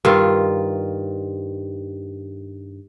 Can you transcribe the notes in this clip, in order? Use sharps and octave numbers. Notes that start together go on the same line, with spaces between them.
G2 D#3 F4